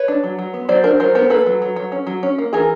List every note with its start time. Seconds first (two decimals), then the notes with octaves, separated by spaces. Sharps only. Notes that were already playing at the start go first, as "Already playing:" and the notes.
Already playing: B4 C#5
0.08 D4
0.24 F#3
0.39 F#3
0.54 B3
0.69 F#3 C5 D5
0.84 D4 A#4 C5
1.00 F#3 A#4 C5
1.15 B3 A#4 C5
1.30 A#3 A4 B4
1.46 F#3
1.62 F#3
1.76 F#3
1.92 C#4
2.07 F#3
2.23 C#4
2.38 A#3
2.53 E3 G#4 A#4